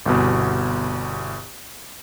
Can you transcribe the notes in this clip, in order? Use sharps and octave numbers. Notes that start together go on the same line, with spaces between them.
G1 C2 B2